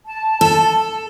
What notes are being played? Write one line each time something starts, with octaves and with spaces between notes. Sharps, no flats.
A5
A4